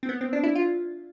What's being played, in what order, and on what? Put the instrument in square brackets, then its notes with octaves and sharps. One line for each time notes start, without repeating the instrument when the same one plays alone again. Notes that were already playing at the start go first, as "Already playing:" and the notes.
[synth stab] C4
B3
C4
D4
E4
F4